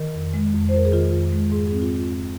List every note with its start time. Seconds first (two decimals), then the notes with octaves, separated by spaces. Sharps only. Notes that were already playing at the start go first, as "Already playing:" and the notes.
Already playing: D#3 A#4
0.14 F2
0.34 G#3
0.54 F2
0.69 C5
0.73 F2 A#4
0.85 G#4
0.92 D#3 F4
1.13 F2
1.33 G#3
1.52 G#2 G#4
1.67 C4 G#4
1.82 F4